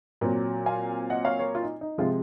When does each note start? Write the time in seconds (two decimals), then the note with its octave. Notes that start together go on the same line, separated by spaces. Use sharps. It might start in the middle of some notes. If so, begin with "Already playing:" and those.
0.21 A#2 F#3 C4
0.66 F5 G#5
1.10 D#5 F#5
1.25 C#5 F5
1.39 A#4 C#5
1.55 F4
1.63 D#4
1.81 D#4
1.98 C3 F3 G#3 C4 F4